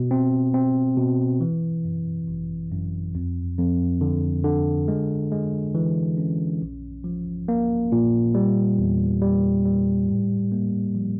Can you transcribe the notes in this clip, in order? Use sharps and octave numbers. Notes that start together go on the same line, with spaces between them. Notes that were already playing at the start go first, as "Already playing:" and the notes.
Already playing: B2
C4
C4
B2
E3
F#2
G#1
F#2
F2
F2
D3
D3
G#3
G#3
E3
C#4
A#1
F3
A#3
A#2
G3
E2
G3
G3
A2
A#3
F3